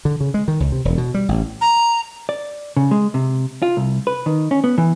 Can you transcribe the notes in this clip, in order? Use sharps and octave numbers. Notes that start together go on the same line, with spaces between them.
D3
C#3
G#3
D#3
C#2
C3
E1
B2
G3
A1
A#5
D5
C#3
G#3
C3
F4
C2
B4
D#3
C#4
B3
E3